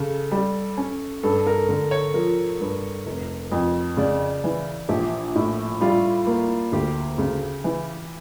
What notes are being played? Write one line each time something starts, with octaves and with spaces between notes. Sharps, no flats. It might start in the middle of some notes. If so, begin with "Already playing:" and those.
Already playing: C#3 A4
G3
C#4
G2 A4
A#4
D3 A#4
C#5
F3 A#4
G2
F1
F2
C#3 D5
E3
A#1 G4
A2
G3 F4
A#3
D2 G4
C#3
E3